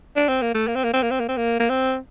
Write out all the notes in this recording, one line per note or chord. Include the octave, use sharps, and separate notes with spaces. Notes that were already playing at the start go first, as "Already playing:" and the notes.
D4
C4
A#3
A3
A#3
C4
A#3
C4
A#3
C4
A#3
C4
A#3
A#3
C4